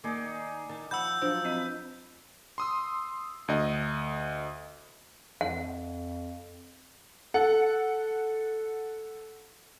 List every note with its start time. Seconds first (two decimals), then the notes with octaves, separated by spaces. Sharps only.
0.04 D#3 A#3 D#4 G#4 D5
0.69 D#3 A5
0.91 F3 F#5 B5 E6 G6
1.22 F3 F#3 D4 F4 C5
1.44 C4 F4 B4 D#5 B5
2.58 C6 D#6 E6
3.48 D2 D#5
5.41 F2 F#5
7.34 A4 F#5